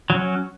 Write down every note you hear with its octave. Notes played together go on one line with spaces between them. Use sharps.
F#3 C#4